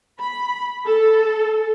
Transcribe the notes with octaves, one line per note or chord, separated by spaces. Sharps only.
B5
A4